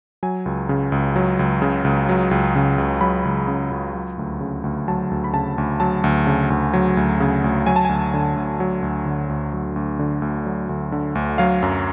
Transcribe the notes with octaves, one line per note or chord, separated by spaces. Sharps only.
F#3 G#5
C#2
C#3
C#2
F#3
C#2
C#3
C#2
F#3
C#2
C#3
C#2
F#3 B5
C#2
C#3
C#2
F#3
D2
C#3
D2
F#3 A5
D2
B5
C#3 A5
D2
F#3 A5
D2
C#3
D2
F#3
D2
C#3
D2
F#3 G#5
A5
D2 G#5
D3
D2
F#3
D2
D3
D2
F#3
D2
D3
D2
F#3
D2
D3
D2
F#3 F5
F#2